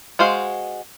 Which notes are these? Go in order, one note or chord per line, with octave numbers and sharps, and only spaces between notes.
G#3 F#4 C5 F5